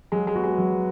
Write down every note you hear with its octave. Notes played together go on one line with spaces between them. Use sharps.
F#3 G#3
G#3
B3 F#4 B4
G#3
F#3